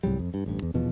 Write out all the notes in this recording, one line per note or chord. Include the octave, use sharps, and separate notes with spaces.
C2 G#2 F#3 G3
F2
G2
A1 G2
E2
D#1 E2 B2 F3